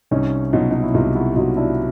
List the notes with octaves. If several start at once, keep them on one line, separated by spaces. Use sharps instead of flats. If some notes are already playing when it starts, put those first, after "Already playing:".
C2 C#4 D#4
B2 F#3 D#4 F4
D#4
E4
C2 D#4 F4
E4 F#4
B2 F#3 D#4 F4
D4 E4